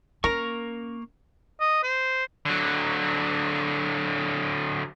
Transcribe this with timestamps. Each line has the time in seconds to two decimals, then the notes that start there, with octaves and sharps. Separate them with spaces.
0.24 A#3 C#4 A#4 A#5 C#6
1.61 D#5
1.83 C5
2.46 D3 F#3